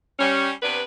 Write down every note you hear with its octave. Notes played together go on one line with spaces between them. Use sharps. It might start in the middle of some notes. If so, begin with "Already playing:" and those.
G3 C#4
C3 B3 D4 B4